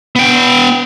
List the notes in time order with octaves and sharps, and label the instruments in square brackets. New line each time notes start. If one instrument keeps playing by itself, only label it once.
[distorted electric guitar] B3 G5